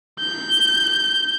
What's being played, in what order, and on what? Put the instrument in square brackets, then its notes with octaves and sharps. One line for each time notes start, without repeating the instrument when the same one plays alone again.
[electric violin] G6